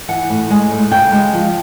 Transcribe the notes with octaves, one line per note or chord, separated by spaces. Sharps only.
E3 F#5
A2
G#3
A2
C#3 G5
G#3
F3